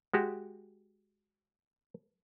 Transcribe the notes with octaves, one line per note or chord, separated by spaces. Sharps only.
G#3 F#4 G4